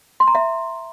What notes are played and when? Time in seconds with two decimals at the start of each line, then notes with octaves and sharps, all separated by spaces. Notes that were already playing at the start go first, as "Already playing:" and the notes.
0.20 C6
0.27 A#5
0.35 E5